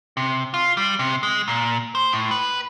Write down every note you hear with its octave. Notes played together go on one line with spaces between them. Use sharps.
C3
F4
G3
C3
G#3
A#2
C5
A2
B4